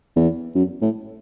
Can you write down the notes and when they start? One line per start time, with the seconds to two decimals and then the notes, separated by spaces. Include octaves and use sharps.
0.16 E2
0.55 F#2
0.81 A2